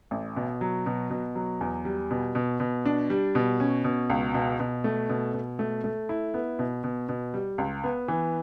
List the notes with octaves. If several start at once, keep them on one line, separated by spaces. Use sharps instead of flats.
A1
B2
F#3
B2
B2
F#3
E2
G3
B2
B2
B2
D4
G3
B2
C#4
B2
C#2
B2
B2
A3
B2
B2
A3
A3
E4
B3
B2
B2
B2
G3
C#2
B3
E3